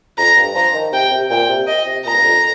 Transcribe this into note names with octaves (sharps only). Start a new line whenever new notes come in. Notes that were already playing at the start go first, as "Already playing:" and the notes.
F2 A#5
G2
F3 A#5
D#3
C3 G5
C3
A#2 G5
C3
D#5
C3
A#2 A#5
G2
F2